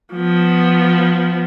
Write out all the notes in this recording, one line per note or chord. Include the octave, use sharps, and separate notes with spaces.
F3 B3